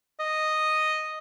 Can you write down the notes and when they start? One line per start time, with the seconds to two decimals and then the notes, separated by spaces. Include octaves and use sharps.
0.20 D#5